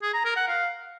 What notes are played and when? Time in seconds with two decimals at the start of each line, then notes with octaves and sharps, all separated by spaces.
0.02 G#4
0.14 A#5
0.25 A#4
0.36 F#5
0.48 F5